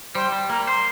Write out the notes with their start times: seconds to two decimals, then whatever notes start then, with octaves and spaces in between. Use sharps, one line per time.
0.14 G3 C5
0.32 G3
0.49 A#3 A#5
0.67 C5 C6